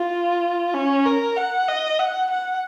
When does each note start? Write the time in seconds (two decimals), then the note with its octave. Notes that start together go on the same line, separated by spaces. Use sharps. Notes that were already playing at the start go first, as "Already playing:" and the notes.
Already playing: F4
0.74 C#4
1.05 A#4
1.37 F#5
1.68 D#5
2.00 F#5
2.31 F#5